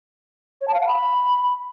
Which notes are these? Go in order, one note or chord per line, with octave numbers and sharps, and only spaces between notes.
C#5
A5
F5
F#5
B5